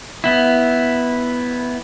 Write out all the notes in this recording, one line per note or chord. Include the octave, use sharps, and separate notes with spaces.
B3 E4